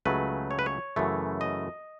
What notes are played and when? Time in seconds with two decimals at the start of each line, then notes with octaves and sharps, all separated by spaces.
0.06 C#2 C#3 F#3 A3 B4
0.51 C#5
0.59 B4
0.66 C#5
0.96 F#2 C#3 E3 A3
1.41 D#5